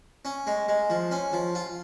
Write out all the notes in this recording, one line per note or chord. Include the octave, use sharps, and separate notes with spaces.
C#4
G#3
G#3
F3
C#4
F3
F4